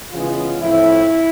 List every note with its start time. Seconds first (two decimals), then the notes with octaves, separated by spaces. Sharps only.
0.11 C#3 E3 G#3 B3 F4
0.61 A2 F3 A3 C4 E4